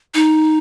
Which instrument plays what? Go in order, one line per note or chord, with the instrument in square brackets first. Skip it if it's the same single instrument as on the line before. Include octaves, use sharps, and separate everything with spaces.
[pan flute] D#4